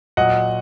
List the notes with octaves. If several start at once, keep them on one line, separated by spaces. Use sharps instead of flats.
A#2 F#3 D#5 F#5